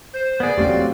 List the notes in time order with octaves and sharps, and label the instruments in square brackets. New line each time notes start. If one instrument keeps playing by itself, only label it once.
[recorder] C5 [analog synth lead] G6
[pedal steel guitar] B3 G#4 [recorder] D5 [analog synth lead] D#6
[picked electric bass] E1 A3 C#4 [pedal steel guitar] F#3 C4 F4 [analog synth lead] G4